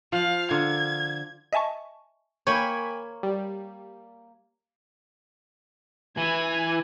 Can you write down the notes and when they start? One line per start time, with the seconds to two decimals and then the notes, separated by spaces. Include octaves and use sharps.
0.12 F3 F5
0.51 D3 F4 A#4 G#6
1.53 D#5 E5 G#5 A5 C#6
2.47 A#3 C#5 G5 G#5 B5
3.23 G3
6.17 E3 G#5